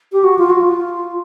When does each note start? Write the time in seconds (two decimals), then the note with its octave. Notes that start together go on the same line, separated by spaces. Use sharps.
0.12 G4
0.24 F#4
0.38 F4
0.50 F#4
0.60 F4